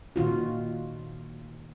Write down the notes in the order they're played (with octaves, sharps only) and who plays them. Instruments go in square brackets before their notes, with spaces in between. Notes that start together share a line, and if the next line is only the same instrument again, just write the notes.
[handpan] A#2 D#3 F4 F#4